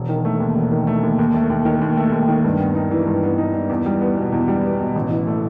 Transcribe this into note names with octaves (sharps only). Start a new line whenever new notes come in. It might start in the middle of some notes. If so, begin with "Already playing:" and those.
Already playing: E1
D#3
A3
D#2
E1
D#3
A3
D#2
D#2
A3
D#2
D#3
D#2
A3
D#2
D#3
G2
B3
D#4
E3
G2
B3
D#4
E3
E2
G3
B3
B2
E2
G3
B3
B2
A1
E3
A3